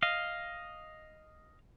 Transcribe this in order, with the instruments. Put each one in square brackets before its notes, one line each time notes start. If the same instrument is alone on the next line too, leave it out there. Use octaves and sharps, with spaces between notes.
[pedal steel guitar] D#5 F5